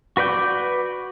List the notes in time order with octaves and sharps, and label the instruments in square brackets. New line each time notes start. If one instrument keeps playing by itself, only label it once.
[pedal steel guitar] F#4 B4 D5 G6